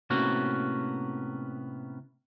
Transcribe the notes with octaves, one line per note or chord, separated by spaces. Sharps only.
A2 C3 A#3 B3 C#4 F#4